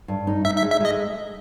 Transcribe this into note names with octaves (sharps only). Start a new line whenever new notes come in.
G2
D#4
D#4 E5
E5
G#3
E5
G#3 D#5